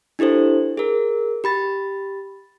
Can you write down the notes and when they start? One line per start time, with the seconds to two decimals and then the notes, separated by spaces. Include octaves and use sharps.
0.19 D4 E4 G4 A4 C5
0.77 G#4 A#4
1.44 G4 B5 A6